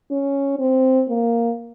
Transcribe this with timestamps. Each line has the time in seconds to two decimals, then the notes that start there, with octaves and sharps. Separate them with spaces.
0.11 C#4
0.59 C4
1.09 A#3